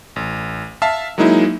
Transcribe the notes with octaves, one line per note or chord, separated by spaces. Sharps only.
A1
E5 F5 A5
F#3 G#3 A#3 D#4 E4